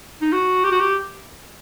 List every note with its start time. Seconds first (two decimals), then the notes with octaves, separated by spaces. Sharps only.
0.21 D#4
0.32 F#4
0.64 G4
0.72 F#4
0.80 G4